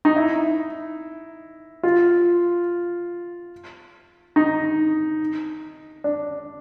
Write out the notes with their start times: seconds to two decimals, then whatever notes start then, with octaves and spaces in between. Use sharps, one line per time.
0.05 D#4
0.16 E4
1.83 F4
4.36 D#4
6.04 D4